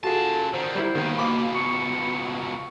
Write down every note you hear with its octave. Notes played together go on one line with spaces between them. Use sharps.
C#3 F4 F#4 G#4 A4 A5
D3 D#3 C5
G3 E4
D#2 B2 D#3
C#2 B2 A#3 B5 D6
C#6